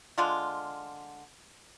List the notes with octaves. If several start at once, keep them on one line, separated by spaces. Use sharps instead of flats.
D3 G#3 F4